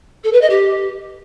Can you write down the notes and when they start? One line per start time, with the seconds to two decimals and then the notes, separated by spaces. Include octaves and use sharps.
0.24 A4
0.32 B4
0.41 D#5
0.50 G4